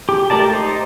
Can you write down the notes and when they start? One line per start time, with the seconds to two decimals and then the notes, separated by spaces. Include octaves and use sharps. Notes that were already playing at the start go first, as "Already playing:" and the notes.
0.09 G4
0.30 A3 G4 A#4 D5 A5
0.53 D#4 C5